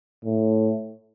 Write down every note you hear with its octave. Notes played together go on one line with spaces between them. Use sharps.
A2